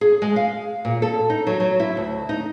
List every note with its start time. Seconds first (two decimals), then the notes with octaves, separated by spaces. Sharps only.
0.01 G#4
0.22 G#3
0.36 F5
0.85 A#2
1.02 A4
1.30 D#4
1.47 F#3
1.60 F#3
1.80 E4
1.97 D2
2.29 D#4